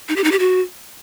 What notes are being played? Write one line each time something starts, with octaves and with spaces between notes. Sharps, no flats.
D#4
G4
D#4
G4
F#4